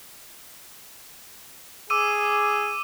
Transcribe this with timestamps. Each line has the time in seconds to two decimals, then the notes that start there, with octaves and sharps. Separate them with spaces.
1.90 G#4 D6 E6 D#7